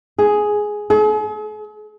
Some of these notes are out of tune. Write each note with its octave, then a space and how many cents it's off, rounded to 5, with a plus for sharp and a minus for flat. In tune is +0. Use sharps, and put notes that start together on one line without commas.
G#4 +5
G#4 +45